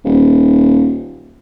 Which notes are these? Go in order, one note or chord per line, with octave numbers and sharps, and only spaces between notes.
D#1